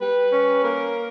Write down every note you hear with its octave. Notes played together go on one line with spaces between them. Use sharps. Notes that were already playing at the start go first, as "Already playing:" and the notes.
G3 B4
C#4
A#3 A#4